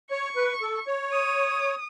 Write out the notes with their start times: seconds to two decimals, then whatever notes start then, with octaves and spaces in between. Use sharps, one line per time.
0.11 C#5 C#6
0.36 B4
0.62 A4
0.87 C#5
1.12 D#6